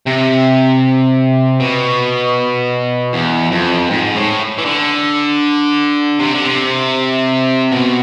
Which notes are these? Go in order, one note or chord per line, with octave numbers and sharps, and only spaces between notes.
C3
B2
E2
F2
G#2
A2
E3
D3
C3
D3
C3
B2